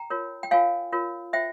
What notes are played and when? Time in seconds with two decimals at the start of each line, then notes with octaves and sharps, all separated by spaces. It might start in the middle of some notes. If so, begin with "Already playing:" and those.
Already playing: G5 A#5
0.10 F4 A#4 C#5
0.43 G5
0.51 F4 A#4 C#5 F5 G#5
0.92 F4 A#4 C#5
1.33 F4 C5 E5 G5